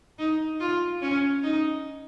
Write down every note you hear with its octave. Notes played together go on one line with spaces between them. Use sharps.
D#4
F4
C#4
D#4